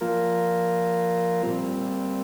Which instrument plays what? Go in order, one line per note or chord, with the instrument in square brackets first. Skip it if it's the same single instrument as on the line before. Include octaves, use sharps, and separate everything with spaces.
[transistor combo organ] F3 A#3 F4 A#4
A#2 G3 C4